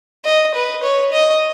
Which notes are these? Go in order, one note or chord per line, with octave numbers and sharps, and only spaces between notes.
D#5
B4
C#5
D#5